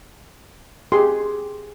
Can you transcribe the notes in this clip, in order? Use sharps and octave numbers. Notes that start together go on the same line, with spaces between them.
G4 G#4 C6